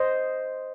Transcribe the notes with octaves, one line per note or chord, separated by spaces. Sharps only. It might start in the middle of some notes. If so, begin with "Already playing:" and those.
Already playing: C5 D#5